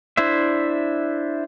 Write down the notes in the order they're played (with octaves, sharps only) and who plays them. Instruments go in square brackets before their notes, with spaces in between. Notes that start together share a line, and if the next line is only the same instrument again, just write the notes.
[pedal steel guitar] D4 E4 C5 E5